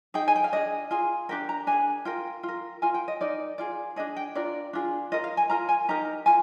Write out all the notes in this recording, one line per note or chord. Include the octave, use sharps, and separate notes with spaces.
D#4 G#4 G5
G#5
G5
F5
D4 G#4 D#5
F4 G#4 G#5
D4 G4 A#4 G5
A#5
D4 G#4 G#5
F4 A#4 G5
F4
A#4
F4 A#4 G#5
G5
D#5
D#4 A#4 D5
F4 G#4 D5
D4 F4 G#4 D#5
G5
D4 F4 A#4 D5
D4 F4 G#4
F4 A#4 D#5
F5
G#5
F4 A#4 A#5
G#5
D#4 G4 A#4 A#5
F4 G#5